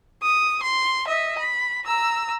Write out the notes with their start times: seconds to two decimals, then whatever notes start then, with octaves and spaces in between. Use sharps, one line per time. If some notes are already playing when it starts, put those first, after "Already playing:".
0.23 D#6
0.63 C6
1.07 D#5 E5
1.39 B5
1.85 A#5 E6